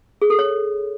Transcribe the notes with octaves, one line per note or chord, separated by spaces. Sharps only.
G#4
A4
C#5